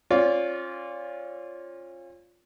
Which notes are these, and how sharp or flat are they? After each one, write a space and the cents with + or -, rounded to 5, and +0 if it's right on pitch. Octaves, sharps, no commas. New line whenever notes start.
C#4 -35 F4 +5 D5 -30